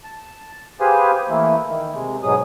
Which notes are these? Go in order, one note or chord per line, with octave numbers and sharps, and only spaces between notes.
A5
G4 G#4 B4 C5 F5 G#5
E3 A3 A#3 E4
D#3
C3 G#3
G#2 B2 F#3 G#4 D#6